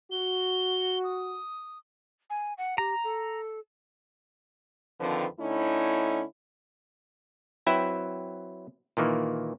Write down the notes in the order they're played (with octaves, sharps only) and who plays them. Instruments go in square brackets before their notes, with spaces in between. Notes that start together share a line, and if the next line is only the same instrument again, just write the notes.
[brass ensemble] F#4 [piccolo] G7
[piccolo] D#6
[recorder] G#5
F#5
[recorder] G4 [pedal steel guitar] A#5
[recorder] A4
[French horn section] F2 D3 D#3 F3 C4 B4
D3 A3 C#4 D#4 E4
[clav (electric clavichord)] F#3 C4 E4 B4 E5 G5
A#2 D#3 E3 A#3